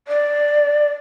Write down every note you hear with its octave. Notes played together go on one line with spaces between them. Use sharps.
D5